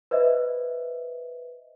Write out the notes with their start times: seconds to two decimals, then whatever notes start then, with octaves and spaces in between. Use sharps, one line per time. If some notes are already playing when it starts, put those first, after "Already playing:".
0.11 B4 C5 D#5 E5